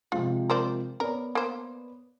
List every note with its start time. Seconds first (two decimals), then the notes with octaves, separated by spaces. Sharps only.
0.12 C3 F3 G#3 F4
0.50 A#4 C5 D5
1.00 B3 A#4 C#5 D5
1.35 A#3 C5